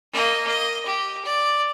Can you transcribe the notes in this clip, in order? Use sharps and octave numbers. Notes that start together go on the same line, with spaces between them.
A#3 D#5
D#5
G4
D5